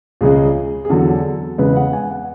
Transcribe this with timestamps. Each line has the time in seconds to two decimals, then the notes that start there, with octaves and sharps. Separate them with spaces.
0.21 C#2 C#3 G#3 G#4
0.85 G#4
0.90 E2 D3 F#3 A4
1.58 E2 C#3 G#3 B4
1.76 F#5
1.93 G#5
2.10 F#5